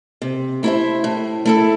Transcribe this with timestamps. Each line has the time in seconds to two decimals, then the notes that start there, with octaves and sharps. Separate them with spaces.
0.22 C3
0.63 A3 E4 C5 E5
1.04 A2
1.45 A3 E4 A4